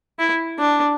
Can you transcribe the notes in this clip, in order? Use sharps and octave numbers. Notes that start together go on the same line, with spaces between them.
E4
D4